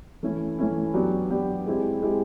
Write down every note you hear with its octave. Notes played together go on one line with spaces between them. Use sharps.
E3 A3 C#4 E4
E3 A3 C#4 E4
F#3 B3 D4 G4
F#3 B3 D4 G4
G#3 C4 E4 G4
G#3 C4 E4 G4